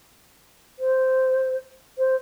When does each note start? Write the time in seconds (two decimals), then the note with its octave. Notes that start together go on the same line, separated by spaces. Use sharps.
0.79 C5
1.98 C5